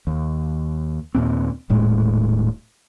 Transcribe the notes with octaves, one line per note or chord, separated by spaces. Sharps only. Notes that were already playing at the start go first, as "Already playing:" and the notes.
D#2
D#2 A#2 C4
D#1 A2 G#3